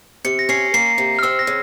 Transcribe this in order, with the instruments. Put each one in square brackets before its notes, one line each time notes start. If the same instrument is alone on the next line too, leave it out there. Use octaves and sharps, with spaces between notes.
[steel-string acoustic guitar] C3 [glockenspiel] C#7
[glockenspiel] A#6
[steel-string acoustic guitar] C#4 [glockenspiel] C7
[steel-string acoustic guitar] A#3 [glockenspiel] C7
[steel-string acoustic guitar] C3
[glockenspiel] F6
[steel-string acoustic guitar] C4 [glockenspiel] E6
[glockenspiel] A#6
[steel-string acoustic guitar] C#3